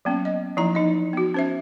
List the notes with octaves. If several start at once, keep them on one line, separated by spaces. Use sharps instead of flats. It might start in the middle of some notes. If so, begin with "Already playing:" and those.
F#3 A#3 B3 C#4
D#5
F3 A#3 D#4 E4 D#5 A#5
E3 D#4 D#5
B3 F#4
C#4 C5 E5